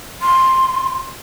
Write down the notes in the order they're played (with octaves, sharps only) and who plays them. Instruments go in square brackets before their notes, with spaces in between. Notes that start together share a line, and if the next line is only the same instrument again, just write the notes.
[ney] C6